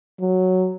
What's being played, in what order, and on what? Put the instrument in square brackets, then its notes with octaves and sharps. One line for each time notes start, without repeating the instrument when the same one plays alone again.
[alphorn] F#3